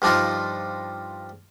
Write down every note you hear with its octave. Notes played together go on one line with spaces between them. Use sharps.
G2 F3 D4 D#4 F4